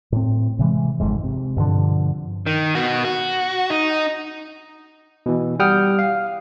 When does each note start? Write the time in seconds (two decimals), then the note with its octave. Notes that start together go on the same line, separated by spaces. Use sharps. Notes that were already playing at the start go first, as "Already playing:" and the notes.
0.12 A2 C4
0.59 C3 E3 G#3
1.00 G#1 F2 G#2
1.23 C3
1.57 G2 B2 D3 F3
2.46 D#3
2.75 B2 F#4
3.05 F#4
3.70 D#4
5.26 B2 E3
5.59 G3 F#5 G5 D#6 F6
5.99 F5